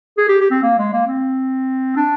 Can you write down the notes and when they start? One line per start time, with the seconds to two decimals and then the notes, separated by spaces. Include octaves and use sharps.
0.18 G#4
0.28 G4
0.41 G4
0.51 C4
0.62 A#3
0.78 G#3
0.93 A#3
1.07 C4
1.97 D4